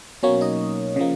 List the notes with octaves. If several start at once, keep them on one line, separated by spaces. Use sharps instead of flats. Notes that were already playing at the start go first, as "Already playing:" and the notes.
B2 F#3 A#3 C#4 C#5
D#4 D#5
C#3 F3 A#3